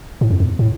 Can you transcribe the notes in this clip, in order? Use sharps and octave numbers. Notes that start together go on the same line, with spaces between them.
A2
F2
E2
A2